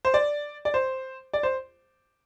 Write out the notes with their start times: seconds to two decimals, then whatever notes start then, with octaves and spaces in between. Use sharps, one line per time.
0.05 C5
0.14 D5
0.65 D5
0.74 C5
1.33 D5
1.43 C5